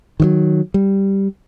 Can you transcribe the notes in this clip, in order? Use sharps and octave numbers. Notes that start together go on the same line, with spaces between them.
D#3 E3 F#3
G3